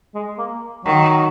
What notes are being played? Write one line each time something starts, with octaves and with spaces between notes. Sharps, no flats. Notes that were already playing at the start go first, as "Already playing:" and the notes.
G#3
A#3
D#3 F#3